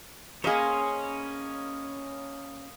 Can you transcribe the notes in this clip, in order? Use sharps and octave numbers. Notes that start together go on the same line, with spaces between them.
A#3 C#4 G#4 C5 C#5 D#5 B5